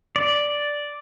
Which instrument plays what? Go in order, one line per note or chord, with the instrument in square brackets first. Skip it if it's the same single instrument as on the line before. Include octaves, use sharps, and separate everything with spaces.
[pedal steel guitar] D5